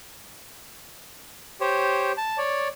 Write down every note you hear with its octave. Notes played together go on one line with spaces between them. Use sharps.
G4 C5 C#5
A5
C#5 D5